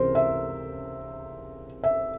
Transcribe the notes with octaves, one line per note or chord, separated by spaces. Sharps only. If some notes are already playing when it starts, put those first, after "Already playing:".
Already playing: C#2 C3 E3 A#4 C5
E5
E5